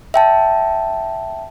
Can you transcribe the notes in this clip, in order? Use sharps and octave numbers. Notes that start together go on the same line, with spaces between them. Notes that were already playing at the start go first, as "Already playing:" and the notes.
E5 G5 A5